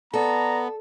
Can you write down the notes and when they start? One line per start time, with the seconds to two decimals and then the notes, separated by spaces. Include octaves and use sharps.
0.14 B3 A4 D5 A5 A#5